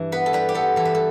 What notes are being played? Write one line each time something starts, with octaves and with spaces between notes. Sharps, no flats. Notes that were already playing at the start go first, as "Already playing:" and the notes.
Already playing: G2 E3
B3 B4
A4
G3 B4
G4
B3 A4
E3 A4
B4
A4